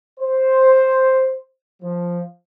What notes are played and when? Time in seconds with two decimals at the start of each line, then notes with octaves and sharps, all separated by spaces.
0.20 C5
1.83 F3